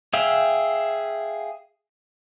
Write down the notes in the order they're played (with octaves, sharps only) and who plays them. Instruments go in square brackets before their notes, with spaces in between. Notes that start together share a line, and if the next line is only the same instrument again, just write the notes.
[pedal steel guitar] G#4 E5 F5 G5